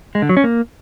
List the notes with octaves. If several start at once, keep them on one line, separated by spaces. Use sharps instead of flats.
G#3
D3
F#3
C#4
A#3